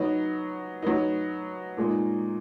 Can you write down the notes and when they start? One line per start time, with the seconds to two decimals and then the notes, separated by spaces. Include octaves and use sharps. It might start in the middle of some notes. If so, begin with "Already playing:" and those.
Already playing: F#3 B3 D#4
0.82 F#3 B3 D#4
1.77 A#2 G#3 D#4